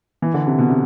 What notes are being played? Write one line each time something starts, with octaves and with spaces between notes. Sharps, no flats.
E3
D3
C3
B2
C3